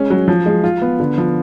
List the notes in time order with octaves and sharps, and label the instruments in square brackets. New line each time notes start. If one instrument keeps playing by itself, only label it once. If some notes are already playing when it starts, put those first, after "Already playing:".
Already playing: [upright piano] G#3 C#4
F#3
F3
G#3
F4
B3
D3
F3